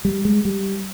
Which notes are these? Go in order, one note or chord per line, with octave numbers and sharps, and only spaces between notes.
G3
G#3
G3